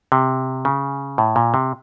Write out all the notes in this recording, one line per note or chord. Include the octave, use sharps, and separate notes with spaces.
C3
C#3
A2
A#2
C3